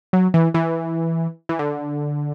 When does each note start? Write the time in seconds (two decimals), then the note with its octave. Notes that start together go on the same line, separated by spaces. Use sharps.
0.13 F#3
0.34 E3
0.54 E3
1.49 E3
1.59 D3